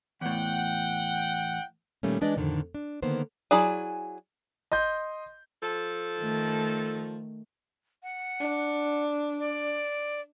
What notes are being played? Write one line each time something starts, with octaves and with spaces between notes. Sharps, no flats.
E2 A2 F#5 G5
A#2 D#3 G3 A3 A#3 C#4
E3 G#3 D4 B4 D5 D#5
F2 A2 D3 D#3
D4
D3 D#3 A#3 B3 C5
F#3 E4 G#4 D5 G#5
D#5 C6 G6
F3 A4
D#3 A3
F#5
D4
D5